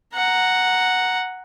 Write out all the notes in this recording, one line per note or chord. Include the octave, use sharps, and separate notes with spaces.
F#5 A#5